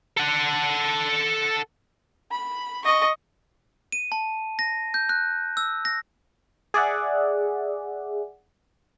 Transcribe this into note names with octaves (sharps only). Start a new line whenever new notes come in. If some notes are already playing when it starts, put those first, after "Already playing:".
A4 F#5
B5
D#5 C#6
D#7
A5
A#6
G6
F#6
E6
A#6
G#4 D5 E5 F#5